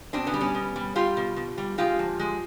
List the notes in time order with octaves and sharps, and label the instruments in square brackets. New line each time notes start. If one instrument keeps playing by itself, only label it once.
[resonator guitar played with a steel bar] B2 C4 D4
B3 C#4
G3
B3 C#4
B2
G3
G3 F4 G4
B2
B2
G3
G#3 F4 G4
F3
G#3